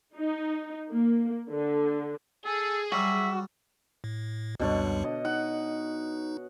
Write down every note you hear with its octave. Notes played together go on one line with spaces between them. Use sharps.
D#4
A#3
D3
G#4 A4
F#3 G3 F#4 E5
A2
C#2 F#2 B2 D3 G3 C#5
D#5
D#4 F#5